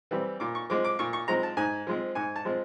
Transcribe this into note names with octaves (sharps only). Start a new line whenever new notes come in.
E3 G3 C4
A#2 D6
C#6
F3 G#3 C4 D6
D6
A#2 C#6
C#6
F3 G#3 C4 A#5
A5
G#2 G#5
F3 G#3 C4
G#2 G#5
A5
F3 G#3 C4